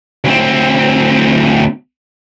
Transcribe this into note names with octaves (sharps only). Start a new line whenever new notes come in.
D2 C4